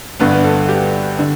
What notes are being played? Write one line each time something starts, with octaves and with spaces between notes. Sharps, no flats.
G1 G2 D3 B3 B4
A4
G4
D3